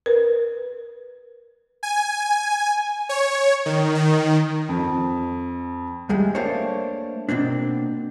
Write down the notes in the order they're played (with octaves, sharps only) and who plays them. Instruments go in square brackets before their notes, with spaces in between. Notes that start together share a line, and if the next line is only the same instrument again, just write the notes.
[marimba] A#4 B4
[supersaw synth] G#5
C#5
D#3
D#3
[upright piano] F2
[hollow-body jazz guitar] D2 G3 G#3
A3 A#3 D4 C5 C#5
B2 A#3 C4 D4